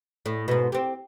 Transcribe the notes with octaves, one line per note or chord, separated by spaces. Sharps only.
A2
G#2 B2
C4 G4